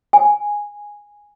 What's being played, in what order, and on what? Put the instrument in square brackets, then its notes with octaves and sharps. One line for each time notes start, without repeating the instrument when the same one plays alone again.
[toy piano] G#5